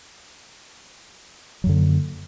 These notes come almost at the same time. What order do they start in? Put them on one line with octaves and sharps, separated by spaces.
F#3 F#2 D3 A#3